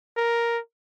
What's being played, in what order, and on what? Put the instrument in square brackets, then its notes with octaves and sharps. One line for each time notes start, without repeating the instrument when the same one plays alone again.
[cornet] A#4